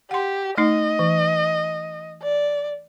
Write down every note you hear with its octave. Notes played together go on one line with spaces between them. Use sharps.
G4 F#5 C6
A3 D#4 D#5
E3
D5